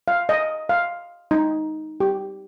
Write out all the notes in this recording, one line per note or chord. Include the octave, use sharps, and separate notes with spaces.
F5
D#5
F5
D#4
G4